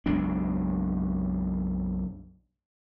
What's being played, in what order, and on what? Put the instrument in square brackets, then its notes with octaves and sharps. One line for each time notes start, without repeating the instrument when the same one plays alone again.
[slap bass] F#1 B1 G#3 D4